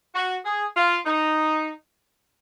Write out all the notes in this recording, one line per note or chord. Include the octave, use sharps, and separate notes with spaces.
F#4
G#4
F4
D#4